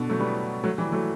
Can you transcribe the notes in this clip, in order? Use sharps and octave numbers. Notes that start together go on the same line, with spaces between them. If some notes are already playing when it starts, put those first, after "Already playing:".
Already playing: B2 D3
F#3 A3
G3 B3
F#3 A3
E3 G3
F#3 A3